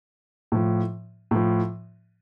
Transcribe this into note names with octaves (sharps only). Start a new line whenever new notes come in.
A2 F3
A2 F3